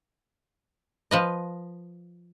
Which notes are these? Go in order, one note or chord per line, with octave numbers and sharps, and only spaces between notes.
F3 B4 D#5